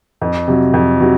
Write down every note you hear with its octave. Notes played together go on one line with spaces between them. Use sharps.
F2
C3 F#3
F2
C3 F#3